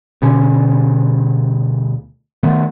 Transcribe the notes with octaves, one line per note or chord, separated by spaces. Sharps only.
D2 B2 D3 C#4
D#3 A3 B3